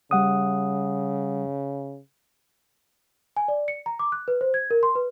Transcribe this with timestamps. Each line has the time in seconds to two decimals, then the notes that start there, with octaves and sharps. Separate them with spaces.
0.11 C#3 G3 F#5 D#6
3.37 G#5
3.48 D5
3.68 C#7
3.86 A#5
3.99 D6
4.12 F#6
4.28 B4
4.41 C5
4.54 G#6
4.71 A#4
4.83 C6
4.95 B4